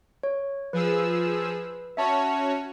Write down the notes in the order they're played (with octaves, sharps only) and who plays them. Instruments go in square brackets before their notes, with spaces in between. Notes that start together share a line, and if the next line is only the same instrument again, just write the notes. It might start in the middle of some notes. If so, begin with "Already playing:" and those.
[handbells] C#5
[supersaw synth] F3 G#4 E6 [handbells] B4
[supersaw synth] C#4 F#4 C#5 [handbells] E5 A5 C#6